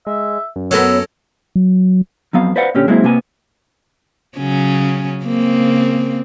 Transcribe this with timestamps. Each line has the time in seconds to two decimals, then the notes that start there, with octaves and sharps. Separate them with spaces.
0.07 G#3 E5
0.56 F#2
0.71 F#3 B3 C#4 A4 A#4 E6
1.56 F#3
2.33 F2 F#3 B3 F5
2.56 B4 C5 D5 F5 F#5
2.75 A#2 D3 C#4 G4
2.87 F#3 G#3 A#3 C4 E4
3.04 C3 A#3 B3 G#5
4.37 C#3 F#3 C#4
5.23 C#3 A#3 C4